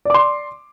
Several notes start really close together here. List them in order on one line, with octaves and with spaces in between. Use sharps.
D5 D6 C6